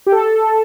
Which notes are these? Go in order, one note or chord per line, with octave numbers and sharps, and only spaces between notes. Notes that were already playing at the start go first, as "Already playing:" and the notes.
G4
A4